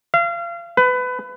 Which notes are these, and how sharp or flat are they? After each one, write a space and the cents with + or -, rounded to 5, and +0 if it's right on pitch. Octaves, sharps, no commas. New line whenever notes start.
F5 -35
B4 +25